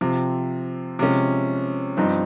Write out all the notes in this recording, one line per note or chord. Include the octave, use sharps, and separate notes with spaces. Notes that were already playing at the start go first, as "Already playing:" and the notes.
C3 F3 C4
C3 F3 G#3 C#4
G2 F3 C4 D#4